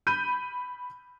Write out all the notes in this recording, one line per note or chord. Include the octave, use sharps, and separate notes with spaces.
B5 G6 D#7